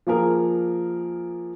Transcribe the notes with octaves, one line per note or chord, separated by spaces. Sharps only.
F3 A#3 F4 G#4 A#4